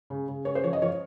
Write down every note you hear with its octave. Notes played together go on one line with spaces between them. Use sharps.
C#3
C#3
C#3 C#5
C5
F3 C#5
D#5
F3 C#5